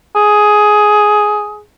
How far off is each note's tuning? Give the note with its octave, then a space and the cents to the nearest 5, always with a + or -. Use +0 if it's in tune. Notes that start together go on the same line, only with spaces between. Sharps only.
G#4 +10